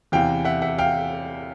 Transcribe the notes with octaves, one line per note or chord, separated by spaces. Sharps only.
E2 C3 E3 F5 G5
E5 F#5
E5 F#5
F5 G5